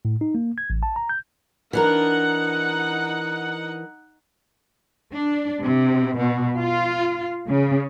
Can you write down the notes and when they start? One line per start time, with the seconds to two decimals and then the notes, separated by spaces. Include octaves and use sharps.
0.05 A2
0.21 D#4
0.35 A#3
0.58 G#6
0.70 A1
0.83 A5
0.96 A#5
1.09 G6
1.73 E3 D4 D#4 A#4 F#5
5.14 D4
5.62 C3
6.16 B2
6.57 F4
7.48 C#3